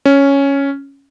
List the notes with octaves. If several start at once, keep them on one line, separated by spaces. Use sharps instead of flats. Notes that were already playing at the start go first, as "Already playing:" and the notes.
C#4